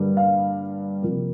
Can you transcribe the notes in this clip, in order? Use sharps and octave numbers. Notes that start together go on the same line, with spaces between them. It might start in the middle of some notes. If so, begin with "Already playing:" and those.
Already playing: G2 D3 G3 A#3
F5
C3 F3 A#3